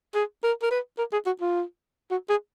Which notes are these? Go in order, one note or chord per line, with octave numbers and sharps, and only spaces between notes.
G#4
A#4
A#4
B4
A#4
G#4
F#4
F4
F#4
G#4